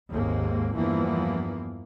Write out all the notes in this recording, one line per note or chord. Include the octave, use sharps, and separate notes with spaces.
G#1 D#2 G#2 G#3 A#3 C4
E2 G2 E3 F3 A#3 B3